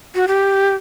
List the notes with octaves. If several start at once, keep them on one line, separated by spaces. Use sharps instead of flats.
F#4
G4